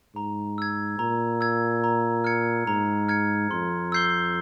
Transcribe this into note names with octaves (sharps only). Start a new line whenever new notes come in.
G#2 A#5
E6 G#6
A#2 A#5
E6 G#6
A#5
F6 G#6 C#7
G#2 A#5
F6 G#6 C#7
F2 C6
E6 G6 C7 G7